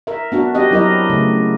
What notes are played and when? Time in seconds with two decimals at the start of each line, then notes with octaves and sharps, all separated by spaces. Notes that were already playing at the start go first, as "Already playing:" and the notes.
0.07 A#4 E5
0.32 B3 D4 F#4
0.55 C4 G4 D#5
0.71 F#3 E4 A#4 D#5
1.10 C#3 A3